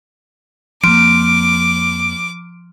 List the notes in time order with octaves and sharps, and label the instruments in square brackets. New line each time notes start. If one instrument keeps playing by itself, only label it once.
[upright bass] F2 A#3 [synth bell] F3 [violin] D6 [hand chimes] D7